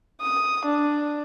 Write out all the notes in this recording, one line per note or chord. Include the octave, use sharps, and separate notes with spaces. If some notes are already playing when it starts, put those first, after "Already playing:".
D#6
D4